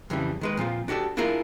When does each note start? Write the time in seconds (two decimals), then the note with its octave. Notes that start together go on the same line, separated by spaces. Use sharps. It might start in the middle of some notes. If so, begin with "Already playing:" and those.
0.10 F2 C#3 E3 G3
0.41 D#3 G#3 B4
0.57 A#2 F3 C4 F4
0.88 D4 F#4 G4 A4 D5
1.17 D4 E4 F4 G#4 A#4